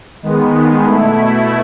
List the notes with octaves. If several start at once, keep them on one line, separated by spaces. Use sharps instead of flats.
D#3 G#3 B3
B2 A3 E4